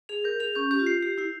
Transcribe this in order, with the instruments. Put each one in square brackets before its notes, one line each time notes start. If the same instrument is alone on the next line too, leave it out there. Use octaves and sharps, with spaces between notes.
[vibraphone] G#4 [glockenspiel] F7
[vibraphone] A#4 [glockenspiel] G6
[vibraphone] G#4 [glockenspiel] F7
[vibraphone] C#4 [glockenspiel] G6
[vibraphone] G4 [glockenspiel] G6
[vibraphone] F4
[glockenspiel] C7
[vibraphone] G4 [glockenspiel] C7
[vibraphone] E4 [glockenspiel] C7